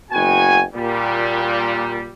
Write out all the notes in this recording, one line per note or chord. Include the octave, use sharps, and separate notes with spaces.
F#1 B3 F#4 G5 G#5
A#2 G3